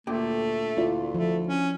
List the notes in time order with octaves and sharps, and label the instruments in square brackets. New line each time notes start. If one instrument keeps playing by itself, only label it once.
[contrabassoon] D2 [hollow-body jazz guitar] A#2 G4 [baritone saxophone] A3
[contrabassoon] D2 [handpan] E4 F4 D5
[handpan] F3 [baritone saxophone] A3
[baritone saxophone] C#4